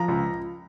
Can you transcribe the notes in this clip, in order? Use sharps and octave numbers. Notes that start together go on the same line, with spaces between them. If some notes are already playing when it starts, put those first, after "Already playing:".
Already playing: F3 A#5
C#2